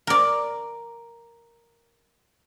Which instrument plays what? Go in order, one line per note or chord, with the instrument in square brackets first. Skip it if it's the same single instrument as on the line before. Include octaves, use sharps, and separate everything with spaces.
[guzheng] A#4 D5